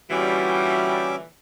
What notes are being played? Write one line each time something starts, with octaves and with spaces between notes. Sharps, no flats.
A#2 D3 E3 G3 C#4 F#4 E5 D6